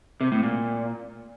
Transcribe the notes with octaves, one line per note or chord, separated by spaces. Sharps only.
C3
A2
A#2